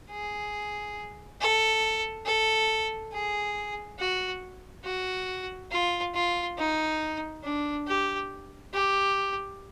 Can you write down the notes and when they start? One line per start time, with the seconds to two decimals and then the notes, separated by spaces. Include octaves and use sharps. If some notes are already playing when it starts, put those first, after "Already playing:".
0.10 G#4
1.41 A4
2.26 A4
3.12 G#4
3.99 F#4
4.84 F#4
5.72 F4
6.14 F4
6.58 D#4
7.43 D4
7.87 G4
8.73 G4